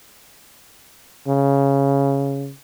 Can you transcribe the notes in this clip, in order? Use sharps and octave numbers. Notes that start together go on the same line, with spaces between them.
C#3